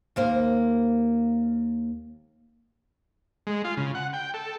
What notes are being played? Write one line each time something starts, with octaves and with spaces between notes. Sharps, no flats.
D#2 A#3 C5
G#3
F4
C#3
F#5
G5
A4